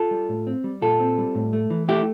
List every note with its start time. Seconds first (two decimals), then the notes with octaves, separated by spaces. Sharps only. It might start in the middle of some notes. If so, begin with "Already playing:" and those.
Already playing: F4 A4
0.11 G3
0.29 A2
0.47 C4
0.64 G3
0.82 A#2 F4 A4
1.00 C4
1.18 G3
1.35 A2
1.53 A3
1.70 E3
1.88 A3 E4 G4